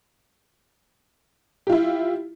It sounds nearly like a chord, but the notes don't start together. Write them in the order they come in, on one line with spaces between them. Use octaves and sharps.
G4 F4 E4